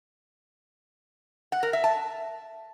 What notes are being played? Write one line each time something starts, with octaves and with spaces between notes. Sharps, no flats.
F#5
A#4
E5
A5